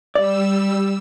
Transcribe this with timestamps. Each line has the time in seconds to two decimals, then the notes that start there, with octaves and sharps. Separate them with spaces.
0.15 G3 D5 E6